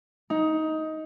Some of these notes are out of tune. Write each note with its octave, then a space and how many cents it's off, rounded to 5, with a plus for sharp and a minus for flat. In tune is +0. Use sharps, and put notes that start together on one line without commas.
D#4 +15